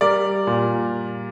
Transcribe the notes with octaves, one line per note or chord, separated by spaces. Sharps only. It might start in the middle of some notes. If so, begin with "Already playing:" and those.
G3 A#4 D5
A#2